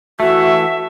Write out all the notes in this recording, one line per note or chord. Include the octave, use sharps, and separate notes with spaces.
E3 A3 F#4 E5